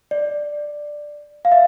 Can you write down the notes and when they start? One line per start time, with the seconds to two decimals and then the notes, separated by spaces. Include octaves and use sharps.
0.11 D5
1.45 F5
1.52 E5